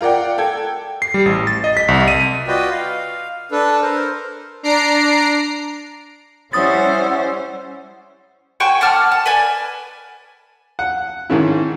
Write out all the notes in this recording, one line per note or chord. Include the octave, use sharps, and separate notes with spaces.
F4 A#4 D5 F#5 G5
A4 G5 G#6
C7
G3
A1
A6
D#5
B6
C2
D#7
F4 F#4 B4 D5 D#5 G5
F5
D4 A4 B4
A#4 C5
D4 A#5 C7 D7
G3 C#4 E4 C5 F#5 D#6 E6 A6
F#4 G5 G#5 C#6
F#5 A5 D6 F6
A5
B4 D5 G#5
F#5
G#2 D#3 C#4 E4